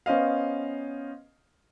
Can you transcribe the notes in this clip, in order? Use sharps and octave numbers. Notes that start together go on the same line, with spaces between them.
B3 C#4 C5 D#5 F5